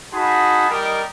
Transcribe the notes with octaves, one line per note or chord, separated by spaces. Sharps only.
D#4 F#4 G#4 A5 B5
G3 D#4 G4 A#4 D#5